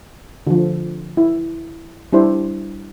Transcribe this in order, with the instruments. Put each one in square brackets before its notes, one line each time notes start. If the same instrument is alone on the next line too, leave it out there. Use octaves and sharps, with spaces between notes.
[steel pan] D3 F3
E4
G3 D4 E4 C5